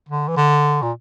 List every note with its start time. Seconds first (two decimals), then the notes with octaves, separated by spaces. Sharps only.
0.09 D3
0.28 E3
0.37 D3
0.82 A#2